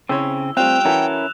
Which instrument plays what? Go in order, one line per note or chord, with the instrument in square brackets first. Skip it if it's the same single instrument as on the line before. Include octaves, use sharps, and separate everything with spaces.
[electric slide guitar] C#3 C4 [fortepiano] E4 C5 C#5 [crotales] E6
[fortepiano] G3 A3 F4 [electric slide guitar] C4 [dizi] G5 [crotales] F#6 E7 F7
[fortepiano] E3 F#4 A4 [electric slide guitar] C#4 E4 A#4